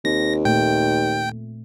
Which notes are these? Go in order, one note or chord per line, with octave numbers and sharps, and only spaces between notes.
D#2 C4 A#6
A#2 A3 G5